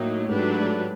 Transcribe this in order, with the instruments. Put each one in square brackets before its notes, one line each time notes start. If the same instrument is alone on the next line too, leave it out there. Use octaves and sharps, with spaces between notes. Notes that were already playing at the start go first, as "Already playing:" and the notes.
Already playing: [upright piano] A2 [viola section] F#3 A#3 D#4
[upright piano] G#2 [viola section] F#3 A3 D4 G4 B4